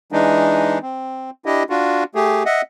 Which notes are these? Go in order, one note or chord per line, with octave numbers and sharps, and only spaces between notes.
E3 G#3 D4 D#4
C4
D4 E4 G4 D#5
D4 F4 F#4
A3 G4 G#4
D#5 E5 F#5